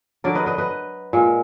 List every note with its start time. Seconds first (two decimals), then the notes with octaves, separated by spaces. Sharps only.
0.24 D3 F#3 A#4 D5
0.35 B4 D#5
0.46 B4 D#5
0.58 B4 D#5
1.13 A#2 G#3